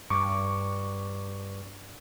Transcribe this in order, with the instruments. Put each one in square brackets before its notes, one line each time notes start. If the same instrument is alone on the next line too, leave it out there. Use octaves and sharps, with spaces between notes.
[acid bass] G2 [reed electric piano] C#6 D6